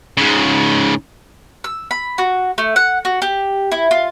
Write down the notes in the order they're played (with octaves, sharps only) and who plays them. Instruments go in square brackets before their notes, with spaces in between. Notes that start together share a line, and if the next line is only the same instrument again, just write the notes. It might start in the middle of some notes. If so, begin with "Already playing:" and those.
[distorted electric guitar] G#2 C#3
[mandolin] E6
B5
F#4
A3
F#5
F#4
G4
E4
F4